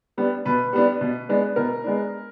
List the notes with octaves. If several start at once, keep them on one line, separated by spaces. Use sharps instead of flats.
G3 B3 D4
B2 B4
G3 B3 D4
B2
G#3 B3 D4
B2 A#4
G#3 B3 D4